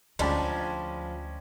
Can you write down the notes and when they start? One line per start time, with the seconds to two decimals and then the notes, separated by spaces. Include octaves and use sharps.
0.19 D2 F3 G#3 C#4 D4 G5 A5 B5